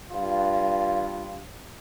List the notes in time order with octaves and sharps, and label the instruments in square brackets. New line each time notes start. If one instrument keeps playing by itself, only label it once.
[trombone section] G2 F4